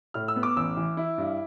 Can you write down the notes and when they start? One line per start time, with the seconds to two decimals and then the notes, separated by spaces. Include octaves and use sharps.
0.14 A2 F6
0.28 E6
0.36 B3
0.43 D6
0.56 A1 E6
0.77 E3
0.97 E4
1.18 G2